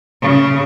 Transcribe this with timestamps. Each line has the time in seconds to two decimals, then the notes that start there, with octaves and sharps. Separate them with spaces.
0.22 C#3